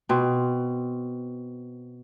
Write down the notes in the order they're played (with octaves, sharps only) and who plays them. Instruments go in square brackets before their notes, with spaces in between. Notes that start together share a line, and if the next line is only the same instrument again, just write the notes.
[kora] B2 C4